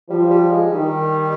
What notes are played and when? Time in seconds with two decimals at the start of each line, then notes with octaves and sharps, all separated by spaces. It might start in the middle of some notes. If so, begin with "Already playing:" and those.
0.10 F3 G3
0.31 G3
0.51 G#3
0.72 D#3 G3